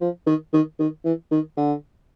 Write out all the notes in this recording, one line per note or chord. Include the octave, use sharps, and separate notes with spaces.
F3
D#3
D#3
D#3
E3
D#3
D3